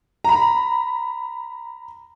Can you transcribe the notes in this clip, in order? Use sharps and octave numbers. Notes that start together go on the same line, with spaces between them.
A#5 B5